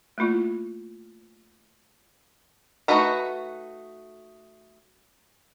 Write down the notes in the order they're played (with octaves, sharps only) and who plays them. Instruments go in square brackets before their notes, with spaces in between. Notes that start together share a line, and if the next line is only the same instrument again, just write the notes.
[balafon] A3 A#3 E4 F4
[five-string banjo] A3 D#4 F#4 B4 A#5